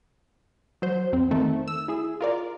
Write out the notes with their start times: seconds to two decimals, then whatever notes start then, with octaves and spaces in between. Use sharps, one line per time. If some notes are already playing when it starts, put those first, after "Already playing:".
0.82 F#3 C5
1.13 F2 C4
1.31 D#3 A3 C4
1.68 E6
1.88 E4 G#4
2.21 F4 A#4 D5